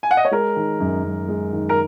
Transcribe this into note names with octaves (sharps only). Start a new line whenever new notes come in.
G#5
F#5
D#5
C#5
G#3 A#4
D#3
F#2
F#2
G#3
D#3
A#4